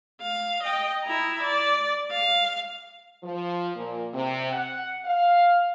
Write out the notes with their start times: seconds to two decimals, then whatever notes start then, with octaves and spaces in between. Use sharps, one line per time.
0.22 F5
0.63 D#5 G5
1.03 E4 A#5
1.42 D5
2.11 F5
3.23 F3
3.76 A#2
4.14 C3
4.53 F#5
5.05 F5